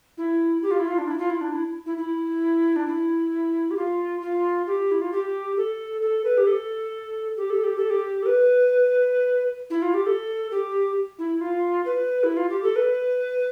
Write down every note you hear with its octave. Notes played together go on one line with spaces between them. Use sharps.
E4
G4
F4
E4
F4
D4
E4
F4
E4
D4
E4
E4
E4
D4
E4
G4
F4
F4
G4
E4
F4
G4
A4
A4
B4
G4
A4
G4
A4
G4
A4
G4
A4
B4
E4
F4
G4
A4
G4
E4
F4
B4
E4
F4
G4
A4
B4